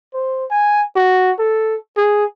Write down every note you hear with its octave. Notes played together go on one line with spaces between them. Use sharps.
C5
G#5
F#4
A4
G#4